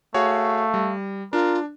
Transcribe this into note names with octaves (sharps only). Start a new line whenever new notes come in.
A3 F#4 G#4 C#5 F5
G3
D4 F4 A#4